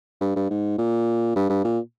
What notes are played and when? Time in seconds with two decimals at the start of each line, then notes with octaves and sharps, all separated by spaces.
0.21 G2
0.36 G2
0.50 G#2
0.78 A#2
1.36 G2
1.49 G2
1.64 A#2